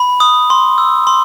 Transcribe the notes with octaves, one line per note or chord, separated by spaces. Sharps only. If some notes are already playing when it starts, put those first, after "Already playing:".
Already playing: B5
D#6
C6
E6
C6